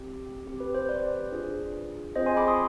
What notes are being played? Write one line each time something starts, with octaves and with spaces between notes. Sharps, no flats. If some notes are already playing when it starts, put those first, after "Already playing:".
Already playing: C4 G4
C4 G4
B4
C5
B4 D5
D4 F4 G#4
C4 F4 G#4 C5 D#5
G#5 C6
B5 D6
C6 D#6